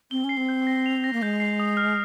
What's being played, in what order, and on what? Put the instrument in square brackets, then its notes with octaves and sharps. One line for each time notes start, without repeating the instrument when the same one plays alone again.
[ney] C4 [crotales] G7
[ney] C#4 [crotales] C7
[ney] C4
[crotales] G6
A#6
F7
A#6
[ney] A#3
[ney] G#3 [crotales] G6
[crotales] C7
D#6
F6